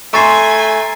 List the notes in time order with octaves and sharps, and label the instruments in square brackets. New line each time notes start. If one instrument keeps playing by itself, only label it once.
[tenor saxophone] A3 [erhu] G#5 [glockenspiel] A#5 A6 C7 [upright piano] C6 C#6